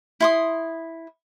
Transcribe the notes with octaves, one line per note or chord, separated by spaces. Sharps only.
E4 C6 D#6